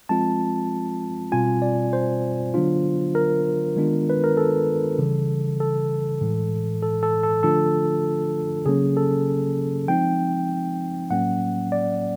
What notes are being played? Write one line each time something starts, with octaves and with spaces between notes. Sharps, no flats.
F3 G#3 C4 F4 A5
B2 G3 C4 F4 G#5
D5
C5
D3 F#3 B3 D4 F4
A#4
D#3 G#3 B3 D4 F4
B4
A#4
A4
C#3 E3 G3
A4
A2 E3 G#3
A4
A4
A4
D3 F3 A3 D4 F4 A4
C#3 F#3 A#3 C#4 G#4
A4
F3 G#3 C4 D#4 G5
A2 F#3 A#3 C#4 F#5
D5